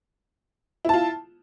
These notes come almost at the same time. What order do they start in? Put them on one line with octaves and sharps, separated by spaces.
E4 A5 F4